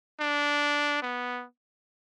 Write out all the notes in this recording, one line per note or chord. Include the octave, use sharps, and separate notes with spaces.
D4
B3